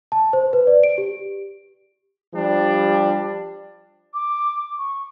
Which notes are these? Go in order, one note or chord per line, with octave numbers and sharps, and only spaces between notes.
A5
C5
B4
D5
D7
G4
F3 G3 D4
D6
C#6